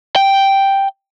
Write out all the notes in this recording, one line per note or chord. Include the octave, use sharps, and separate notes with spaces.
G5